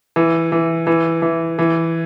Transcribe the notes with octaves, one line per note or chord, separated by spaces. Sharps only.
E3
E3
E3
E3
E3